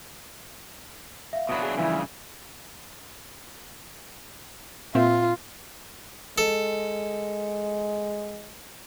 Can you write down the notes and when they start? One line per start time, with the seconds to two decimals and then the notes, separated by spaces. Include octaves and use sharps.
1.33 E5 F5
1.49 B2 F#3 D4 B5 D#6
1.62 G#4
1.77 G2 C#3 E3 F3 E4
4.95 A#2 C4 F4 E5
6.38 G#3 A4